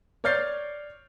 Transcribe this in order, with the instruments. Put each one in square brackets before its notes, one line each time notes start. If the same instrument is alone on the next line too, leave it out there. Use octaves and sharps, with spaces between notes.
[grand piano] C#5 D5 F6 G6 A6 C7